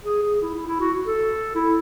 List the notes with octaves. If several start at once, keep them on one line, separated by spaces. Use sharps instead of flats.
G#4
G#4
E4
E4
E4
F#4
A4
E4